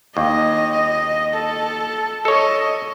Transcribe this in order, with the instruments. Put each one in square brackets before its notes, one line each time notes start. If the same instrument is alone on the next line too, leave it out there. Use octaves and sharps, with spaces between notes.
[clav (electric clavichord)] D#2 [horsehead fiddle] D#5
[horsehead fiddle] A4
[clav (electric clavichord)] A4 C#5 [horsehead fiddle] D#5